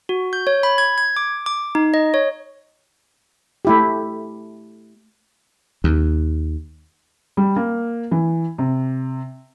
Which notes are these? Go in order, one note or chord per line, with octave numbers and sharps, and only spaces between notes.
F#4
G6
C#5
B5
G#6
G#6
D6
D6
D#4
D#5
C#5
A3 E4 G4
D#2
G3
A#3
E3
C3